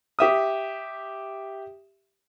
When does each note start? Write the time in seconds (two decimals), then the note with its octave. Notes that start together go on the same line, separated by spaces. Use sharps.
0.19 G4 E5 D#6